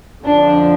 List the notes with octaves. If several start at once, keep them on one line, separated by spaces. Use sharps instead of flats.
F2 D3 F3 D4